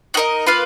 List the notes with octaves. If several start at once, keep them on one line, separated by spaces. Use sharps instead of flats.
D#4 F#4 A#4 D#5
A#3 F4 B4 F5